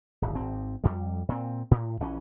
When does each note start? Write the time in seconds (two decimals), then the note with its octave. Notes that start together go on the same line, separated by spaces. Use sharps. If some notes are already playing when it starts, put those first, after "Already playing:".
0.22 D1 G#1
0.35 G#1 C4
0.84 F2 G3
1.29 A#2 C4
1.71 A2
2.00 A#1 E3 C#4